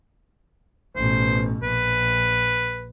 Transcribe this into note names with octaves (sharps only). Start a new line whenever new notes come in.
A1 B2 C5
A#1 B4